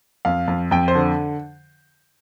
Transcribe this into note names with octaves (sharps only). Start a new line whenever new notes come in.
F2 F5
F2
F2 G5
C5
D3